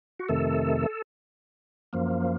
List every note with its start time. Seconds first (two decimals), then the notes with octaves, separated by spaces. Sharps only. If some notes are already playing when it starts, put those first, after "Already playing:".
0.19 F#4
0.29 F2 C3 D#3 A3 A4
1.93 F#2 F3 A#3